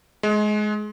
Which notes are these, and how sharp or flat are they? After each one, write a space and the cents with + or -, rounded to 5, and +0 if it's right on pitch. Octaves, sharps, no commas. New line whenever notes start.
G#3 +25